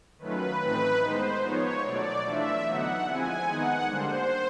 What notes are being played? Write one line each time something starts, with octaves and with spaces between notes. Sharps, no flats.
D#3 F#3 A3 C#4 F4 B4
A2 E3 A3 C4 D#4 B4
D#3 G#3 B3 D#4 C5
F3 G#3 B3 D#4 C#5
B2 F#3 A3 D5
E3 A3 D4 F4 E5
D3 F#3 B3 D#4 F#5
F3 G#3 C4 E4 G#5
D#3 G#3 B3 D#4 F#5
D3 G3 A#3 D4 C5